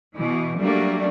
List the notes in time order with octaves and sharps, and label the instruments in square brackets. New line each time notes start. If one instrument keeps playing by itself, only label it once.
[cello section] B2 E3
F#3 G3 A3 A#3 D4